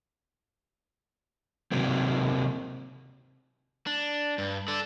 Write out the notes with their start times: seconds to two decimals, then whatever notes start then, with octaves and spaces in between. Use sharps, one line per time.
1.72 C3 D#3 F#3 A#3 C4
3.87 D4
4.38 G2
4.68 A4 D5